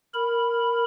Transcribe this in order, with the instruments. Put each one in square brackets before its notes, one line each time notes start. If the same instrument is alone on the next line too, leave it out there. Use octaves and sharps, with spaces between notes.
[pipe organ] A#4 B5